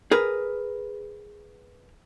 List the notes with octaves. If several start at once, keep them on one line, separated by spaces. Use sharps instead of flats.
G#4 A#4 B4